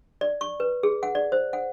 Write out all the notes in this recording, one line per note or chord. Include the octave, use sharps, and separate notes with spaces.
D5
C#6
B4
G#4
F#5
D5
C5
F#5